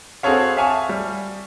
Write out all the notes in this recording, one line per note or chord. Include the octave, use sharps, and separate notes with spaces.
C4 F#4 G#4 A4 C#5 F5
E5 F5 G#5 A5 C#6
G3